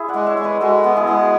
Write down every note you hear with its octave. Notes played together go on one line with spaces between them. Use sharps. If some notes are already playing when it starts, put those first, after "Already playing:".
Already playing: E4 G#4
D5 F#5
G#3
C#5 E5
G#3
B4 D5
G#3 F#4 A4
B3
E4 G#4
G#3